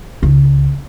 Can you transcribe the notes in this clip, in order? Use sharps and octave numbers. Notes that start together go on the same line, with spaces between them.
C#2 D#4